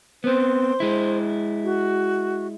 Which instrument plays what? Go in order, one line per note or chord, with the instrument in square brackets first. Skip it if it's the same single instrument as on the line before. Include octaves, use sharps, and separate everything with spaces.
[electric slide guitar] B3 C4 [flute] C5
[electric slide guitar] G#3 E4
[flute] F#4